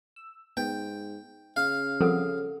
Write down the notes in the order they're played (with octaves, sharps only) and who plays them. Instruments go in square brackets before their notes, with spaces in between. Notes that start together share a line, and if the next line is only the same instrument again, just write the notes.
[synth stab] E6
[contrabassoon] G#2 [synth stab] B3 [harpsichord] G5
[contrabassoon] C#3 [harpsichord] F5
[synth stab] F3 G3 C4 [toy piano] A4 A#4 F#5